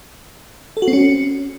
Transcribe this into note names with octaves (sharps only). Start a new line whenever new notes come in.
A4
F#4
C4
C#4